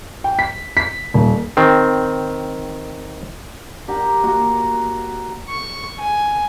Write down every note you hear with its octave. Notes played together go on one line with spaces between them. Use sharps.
G5
B6
B6
D#1
D#3 C4
G4 A#4 F#5
A#3 F#4
C#6
G#5